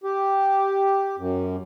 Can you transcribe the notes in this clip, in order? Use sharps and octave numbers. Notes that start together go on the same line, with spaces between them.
G4
F#2